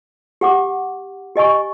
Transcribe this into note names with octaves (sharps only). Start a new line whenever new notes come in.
G4 F#5 D6
G4 D#5 G#5 C#6